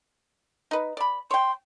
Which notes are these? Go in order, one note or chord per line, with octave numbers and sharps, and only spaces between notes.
D#4 B4
D5 B5
C#5 G5 C6